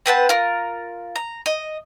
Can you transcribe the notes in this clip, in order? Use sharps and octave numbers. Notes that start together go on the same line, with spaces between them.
C4 B4 F#5 A5
F4 A#4
A#5
D#5